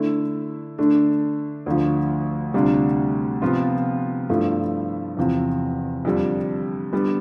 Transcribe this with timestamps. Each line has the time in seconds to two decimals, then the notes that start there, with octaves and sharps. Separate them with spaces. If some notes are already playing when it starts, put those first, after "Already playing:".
Already playing: D3 A3 E4
0.78 D3 A3 D4
1.66 D2 D3 F3
2.54 D2 C3 G3 D4 F4
3.42 C3 F3 B3 F4
4.29 G2 F3 A3 E4
5.17 E2 C3 F3
6.05 F2 D3 G3 D4
6.93 D3 G3 B3